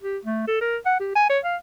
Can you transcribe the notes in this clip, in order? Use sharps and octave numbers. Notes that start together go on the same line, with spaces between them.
G4
A3
A4
A#4
F#5
G4
G#5
C#5
F5